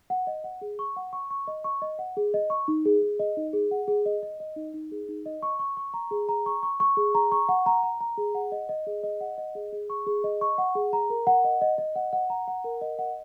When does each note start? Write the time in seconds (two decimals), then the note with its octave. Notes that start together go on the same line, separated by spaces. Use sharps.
0.10 F#5
0.27 D#5
0.44 F#5
0.61 G#4
0.79 C#6
0.96 F#5
1.13 C#6
1.31 C#6
1.47 D#5
1.64 C#6
1.82 D#5
1.99 F#5
2.17 G#4
2.34 D#5
2.50 C#6
2.68 D#4
2.85 G#4
3.02 G#4
3.19 D#5
3.37 D#4
3.53 G#4
3.71 F#5
3.88 G#4
4.06 D#5
4.23 D#5
4.40 D#5
4.56 D#4
4.74 D#4
4.92 G#4
5.09 D#4
5.26 D#5
5.43 C#6
5.59 C#6
5.77 C#6
5.94 A#5
6.11 G#4
6.29 A#5
6.46 C#6
6.63 C#6
6.80 C#6
6.97 G#4
7.15 A#5
7.32 C#6
7.49 F#5
7.66 A#5
7.83 A#5
8.01 A#5
8.18 G#4
8.35 F#5
8.52 D#5
8.69 D#5
8.87 G#4
9.03 D#5
9.21 F#5
9.38 D#5
9.55 G#4
9.73 G#4
9.90 C#6
10.07 G#4
10.24 D#5
10.41 C#6
10.58 F#5
10.75 G#4
10.93 A#5
11.10 A#4
11.27 F#5
11.44 D#5
11.61 D#5
11.78 D#5
11.95 F#5
12.13 F#5
12.30 A#5
12.48 F#5
12.64 A#4
12.81 D#5
12.99 F#5